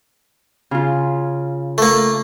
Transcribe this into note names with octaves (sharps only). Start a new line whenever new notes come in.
C#3 F4
A3 A#3